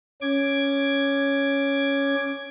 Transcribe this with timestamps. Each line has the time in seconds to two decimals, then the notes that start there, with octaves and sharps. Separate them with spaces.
0.21 C#4 D6 G#6